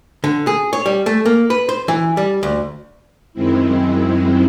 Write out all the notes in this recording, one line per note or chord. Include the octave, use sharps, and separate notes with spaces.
D3
G#4
C#5
G3
A3
A#3
B4
C5
E3
G3
D2
F#2 D#3 G#3 C4 E4